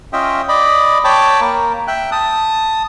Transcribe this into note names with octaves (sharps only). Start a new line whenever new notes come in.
C#4 F4 D#5 E5 G5
D5 D#5 B5
C#5 G5 A5 B5 D6
A#3
E5 G5 F#6
A5 D#6